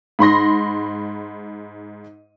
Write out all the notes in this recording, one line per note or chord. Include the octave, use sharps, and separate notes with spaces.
G#2 B5 C6 A#6